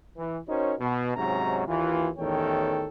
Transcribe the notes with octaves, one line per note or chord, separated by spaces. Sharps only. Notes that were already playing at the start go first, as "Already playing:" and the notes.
E3
C#4 D#4 F#4 A#4 C5 C#5
B2
G#2 C3 F#3 C#4 D#4 A#5
D#2 E3 F4
A1 E2 D#3 A4 C#5 G5